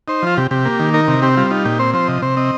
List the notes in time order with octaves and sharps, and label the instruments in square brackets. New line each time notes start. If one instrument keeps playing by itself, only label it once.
[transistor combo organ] D#4 C5
F3 F4
C3 G4
C3 G4
A#3
D#3
D#4 A#4
C3
C4 G4
G3 F4
D#4 F4
A#2 G4
C4 C5
F3 C5
C3 D#5
C3 C5
C4 D#5